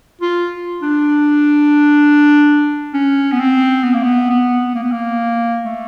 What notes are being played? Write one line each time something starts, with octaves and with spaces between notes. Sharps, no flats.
F4
D4
C#4
B3
C4
B3
A#3
B3
B3
A#3
B3
A#3
A3